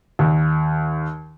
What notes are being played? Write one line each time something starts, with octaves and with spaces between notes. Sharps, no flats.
D#2